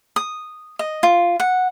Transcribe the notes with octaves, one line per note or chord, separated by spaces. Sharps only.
D#6
D#5
F4
F#5